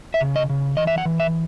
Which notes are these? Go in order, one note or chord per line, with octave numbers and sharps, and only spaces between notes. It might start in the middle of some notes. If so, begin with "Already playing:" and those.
E5
C#3
D#5
C#3
E3 D#5
E5
F#5
E3
E5